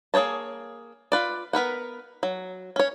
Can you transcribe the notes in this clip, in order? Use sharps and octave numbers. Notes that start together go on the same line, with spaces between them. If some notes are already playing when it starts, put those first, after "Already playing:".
A#3 G#4 C5 C#5 A5
F4 B4 D5
B3 A#4 B4 F#5
F#3
C#4 C#5